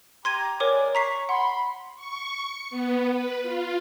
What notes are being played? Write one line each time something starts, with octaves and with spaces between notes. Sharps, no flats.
G4 A#5 C6 G#6 D#7
G#3 A#4 C#5 D5 G#5 D6
C#5 A#5 C#6 B6 C7
F#5 B5 C6
C#6
C#7
B3
B4
F4